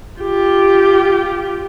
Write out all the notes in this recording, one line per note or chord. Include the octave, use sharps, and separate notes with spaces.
F4 G4